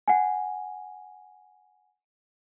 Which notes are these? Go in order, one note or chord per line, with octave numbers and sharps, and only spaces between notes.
F#5 G#5